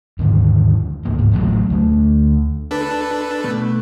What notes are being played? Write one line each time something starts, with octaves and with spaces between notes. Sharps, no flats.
D#2 G#2 D3
C#2 C3 A#3
E1 G#2
A1 A2 D#3 F#3
D2 A3
D4 A4 B4
B2 A3